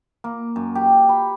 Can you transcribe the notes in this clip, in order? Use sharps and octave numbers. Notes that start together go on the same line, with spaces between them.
A#3
F#2
G4
B5